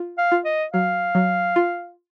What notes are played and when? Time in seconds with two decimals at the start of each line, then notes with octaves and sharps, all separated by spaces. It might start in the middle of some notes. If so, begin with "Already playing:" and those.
Already playing: F4
0.18 F5
0.32 F4
0.45 D#5
0.73 F#3 F5
1.15 F#3
1.56 F4